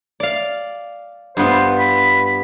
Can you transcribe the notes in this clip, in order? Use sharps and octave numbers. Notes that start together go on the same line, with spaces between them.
D5 F5
G2 B3 F4 C5
B5